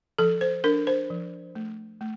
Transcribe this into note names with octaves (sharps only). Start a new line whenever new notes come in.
F3 A4
C5
D4 A#4
C5
F3
A3
A3